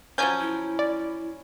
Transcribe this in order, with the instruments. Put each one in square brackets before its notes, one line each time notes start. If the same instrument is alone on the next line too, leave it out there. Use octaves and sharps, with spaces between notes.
[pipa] F3 F#3 C#4 [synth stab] G#5 G6
[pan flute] E4
[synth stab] D5